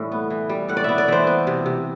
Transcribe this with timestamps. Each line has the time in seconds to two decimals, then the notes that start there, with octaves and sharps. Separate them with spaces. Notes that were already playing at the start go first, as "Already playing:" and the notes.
Already playing: A2 E3 G3
0.12 B3
0.30 E3
0.49 G3
0.68 A2 F#5
0.77 D5
0.84 B3 E5
0.98 D5
1.08 E3 C5
1.27 B3
1.47 C3
1.66 C3